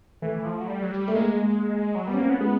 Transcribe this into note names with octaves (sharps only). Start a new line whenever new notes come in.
E3 A3
E3
F3
F#3
G3
F#3
G3
A3
G#3 A#3
F#3
G3 B3
C#4
A#3 C4
B3 C#4
G#3 B3